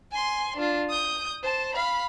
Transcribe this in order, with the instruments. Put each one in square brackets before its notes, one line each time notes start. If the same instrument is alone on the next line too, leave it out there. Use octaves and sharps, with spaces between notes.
[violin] G#5 C6
D4 F4
D#6 G6
C5 A5
F5 B5